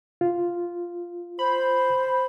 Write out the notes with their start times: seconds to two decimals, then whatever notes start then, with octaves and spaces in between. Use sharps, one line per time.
0.21 F4
1.39 C5 B5